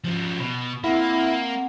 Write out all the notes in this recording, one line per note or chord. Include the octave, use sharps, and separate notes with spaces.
F3 C#4
B2 B5
A#3 C4 E4 F#5